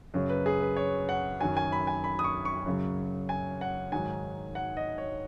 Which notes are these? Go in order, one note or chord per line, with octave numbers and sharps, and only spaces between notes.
F#2 C#3 F#3
B4
G#4
B4
C#5
F#5
F#2 D#3 F#3 G#5
G#5
B5
G#5
B5
D#6
C#6
C#6
F#2 C#3 F#3
G#5
F#5
G#2 D#3 F#3 G#5
F#5
D#5
C#5